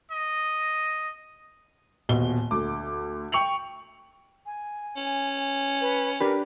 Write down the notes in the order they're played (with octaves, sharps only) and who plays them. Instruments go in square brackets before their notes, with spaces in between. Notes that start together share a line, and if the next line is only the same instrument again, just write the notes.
[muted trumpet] D#5
[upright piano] D#1 B2 G7
D2 D6
G5 C#6 C#7 F7 F#7
[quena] G#5
[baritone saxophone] C#4
[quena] B4
[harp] D4 G4 B4 [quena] A#4